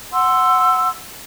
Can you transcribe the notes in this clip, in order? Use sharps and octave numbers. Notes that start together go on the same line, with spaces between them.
F#5 C6 E6